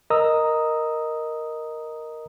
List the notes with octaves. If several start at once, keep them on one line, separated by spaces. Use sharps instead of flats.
A#4 D#5 A#5 D#6 E6